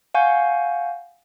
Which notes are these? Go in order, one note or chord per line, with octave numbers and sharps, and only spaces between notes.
F5 F#5 G#5 C#6 G6